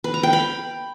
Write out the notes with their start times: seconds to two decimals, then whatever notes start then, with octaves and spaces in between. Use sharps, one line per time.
0.04 B4
0.14 A#5
0.23 G5
0.33 B5